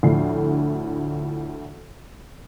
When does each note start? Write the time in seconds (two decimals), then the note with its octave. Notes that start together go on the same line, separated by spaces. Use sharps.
0.03 D2 A2 D3 F3 C7